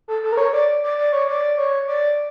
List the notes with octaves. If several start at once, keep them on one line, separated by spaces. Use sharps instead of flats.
A4
A4
A#4
C#5
D5
D5
D5
C#5
D5
C#5
D5